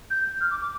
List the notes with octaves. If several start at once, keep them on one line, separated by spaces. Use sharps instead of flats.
G6
F6
D6
D6